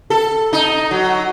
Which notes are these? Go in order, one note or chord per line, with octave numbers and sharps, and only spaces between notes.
A4
D#4
F#3